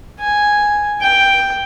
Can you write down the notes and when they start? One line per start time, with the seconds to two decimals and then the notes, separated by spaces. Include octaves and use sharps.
0.20 G#5
1.02 G5